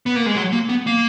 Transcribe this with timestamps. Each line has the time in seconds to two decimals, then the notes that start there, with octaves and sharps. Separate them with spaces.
0.06 B3
0.16 A#3
0.26 G#3
0.36 F#3
0.53 A#3
0.69 B3
0.87 A#3